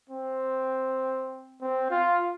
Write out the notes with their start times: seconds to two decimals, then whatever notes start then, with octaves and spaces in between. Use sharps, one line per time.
0.10 C4
1.62 C4
1.91 F4